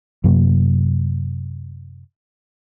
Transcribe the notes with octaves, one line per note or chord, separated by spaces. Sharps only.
F#2 C3 F#3 A#3